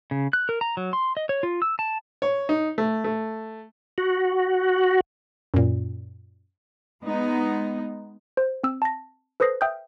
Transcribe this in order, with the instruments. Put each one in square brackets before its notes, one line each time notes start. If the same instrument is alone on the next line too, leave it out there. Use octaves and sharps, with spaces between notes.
[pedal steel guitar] C#3
F#6
A#4
A#5
F#3
C6
D#5
C#5
F4
E6
A5
[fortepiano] C#5
D#4
A3
A3
[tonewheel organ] F#4
[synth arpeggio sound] F#2 A#2
[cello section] G#3 B3 D#4
[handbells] C5
C4 E6
A5 A#6
A4 B4 C5 D#6 A#6 C7
E5 G5 D#6 F6 G6